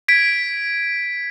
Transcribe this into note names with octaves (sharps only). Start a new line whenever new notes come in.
G#6 B6 D7